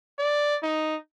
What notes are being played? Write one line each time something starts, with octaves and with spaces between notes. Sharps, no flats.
D5
D#4